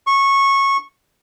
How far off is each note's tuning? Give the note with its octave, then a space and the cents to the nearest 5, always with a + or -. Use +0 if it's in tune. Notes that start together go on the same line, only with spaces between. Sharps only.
C#6 -15